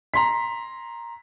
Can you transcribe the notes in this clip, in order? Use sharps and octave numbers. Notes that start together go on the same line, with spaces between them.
A#5 C6 B6